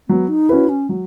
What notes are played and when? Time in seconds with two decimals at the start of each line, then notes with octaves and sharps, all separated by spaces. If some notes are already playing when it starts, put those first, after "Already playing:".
0.09 F#3 B3
0.28 D#4
0.49 C#4 E4 F#4 B4
0.69 C#4
0.89 F#3